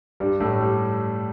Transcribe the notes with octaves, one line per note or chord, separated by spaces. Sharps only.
G2 G3
A2 A3
G3